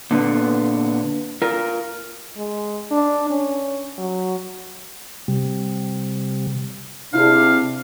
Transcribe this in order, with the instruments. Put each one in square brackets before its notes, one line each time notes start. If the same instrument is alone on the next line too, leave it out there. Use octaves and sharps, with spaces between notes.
[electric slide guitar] A#2 D3 B3
F4 A#4
[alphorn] G#3
D4
C#4
F#3
[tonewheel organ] C3 G3
[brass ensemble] C3 D4 [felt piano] E4 G#4 [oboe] F5